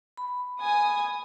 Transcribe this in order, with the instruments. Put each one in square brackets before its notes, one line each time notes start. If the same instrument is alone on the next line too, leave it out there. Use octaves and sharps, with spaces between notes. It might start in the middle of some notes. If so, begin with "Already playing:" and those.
[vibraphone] B5
[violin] G#5 D#6